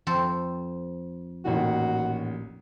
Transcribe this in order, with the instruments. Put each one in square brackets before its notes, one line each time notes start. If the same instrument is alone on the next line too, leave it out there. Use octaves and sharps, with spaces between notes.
[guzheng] F2 A4 C5
[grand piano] A1 A#2 D#3 [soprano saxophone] F#4